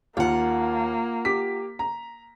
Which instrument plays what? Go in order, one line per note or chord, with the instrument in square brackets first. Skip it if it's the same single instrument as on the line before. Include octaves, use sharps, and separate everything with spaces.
[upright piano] D#2 [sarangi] A#3 [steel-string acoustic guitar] F4 F#5
[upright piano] G4 D6 B6
A#5